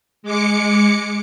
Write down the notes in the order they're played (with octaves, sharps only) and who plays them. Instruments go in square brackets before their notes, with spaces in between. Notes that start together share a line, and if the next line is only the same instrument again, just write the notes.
[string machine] G#3 D6 C#7